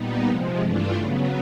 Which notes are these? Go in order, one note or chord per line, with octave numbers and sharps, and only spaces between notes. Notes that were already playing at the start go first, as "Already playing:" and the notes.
Already playing: A#2 G3 B3 D#4
C3 F3 G#3
G2 E3 A3 D4 F4
C#3 F#3 B3